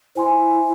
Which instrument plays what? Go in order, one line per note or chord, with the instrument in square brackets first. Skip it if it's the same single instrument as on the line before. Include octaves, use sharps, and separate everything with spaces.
[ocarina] E4 [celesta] C5 G#5 C6